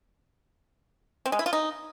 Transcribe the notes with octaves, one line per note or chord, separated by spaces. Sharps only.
C4
G#3
E4
F4
D#4